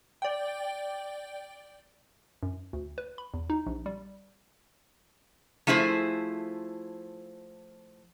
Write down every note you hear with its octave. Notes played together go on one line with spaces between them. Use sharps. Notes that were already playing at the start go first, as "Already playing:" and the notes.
D5 G5
F#2
D2
B4
B5
E2
D#4
A#1
G3
F3 A3 E4 G#4 C5